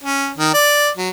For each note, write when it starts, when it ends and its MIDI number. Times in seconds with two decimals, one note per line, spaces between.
0.04 0.31 61
0.37 0.50 51
0.53 0.89 74
0.97 1.10 54